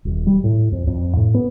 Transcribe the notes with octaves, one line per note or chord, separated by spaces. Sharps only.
D#1
G3
A2
F2
F2
A2
B3